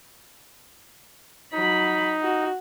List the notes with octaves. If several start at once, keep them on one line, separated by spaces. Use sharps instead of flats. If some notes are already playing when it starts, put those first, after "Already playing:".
F#3 D#4 B5
F#4